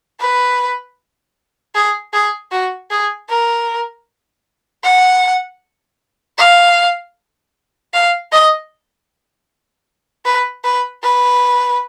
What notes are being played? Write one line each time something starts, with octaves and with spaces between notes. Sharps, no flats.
B4
G#4
G#4
F#4
G#4
A#4
F#5
F5
F5
D#5
B4
B4
B4